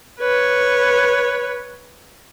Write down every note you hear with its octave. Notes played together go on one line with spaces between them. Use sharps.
B4 C#5